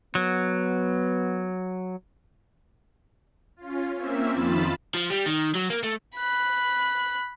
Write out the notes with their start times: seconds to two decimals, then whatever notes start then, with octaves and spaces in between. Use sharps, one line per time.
0.15 F#3 B3
3.56 C#4 F4
3.95 A#3 C4 C#4 E5
4.33 F2 D#3 F4 B5 A6 E7
4.95 F3
5.10 G3
5.26 D#3
5.55 F#3
5.70 A#3
5.83 A3
6.15 B5 F#6